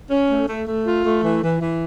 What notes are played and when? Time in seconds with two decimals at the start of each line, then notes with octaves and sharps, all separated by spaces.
0.10 C#4
0.30 A3
0.47 A3
0.66 A3
0.85 F4
1.04 A3
1.23 E3
1.42 E3
1.61 E3